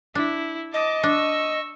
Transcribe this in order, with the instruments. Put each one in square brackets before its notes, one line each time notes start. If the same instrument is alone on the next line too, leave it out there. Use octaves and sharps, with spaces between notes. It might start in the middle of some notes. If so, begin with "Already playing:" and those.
[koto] D4 [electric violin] E4
[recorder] D#5 [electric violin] A5 D6
[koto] D4 [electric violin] C#6 E6